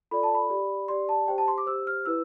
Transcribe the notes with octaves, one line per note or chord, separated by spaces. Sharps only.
F4 A4 D5 B5
A5
B5
G4 D5
G4 D5 C6
A5
G4 C5 G5
A5
C6
D6
G4 C5 E6
F6
E4 B4 E6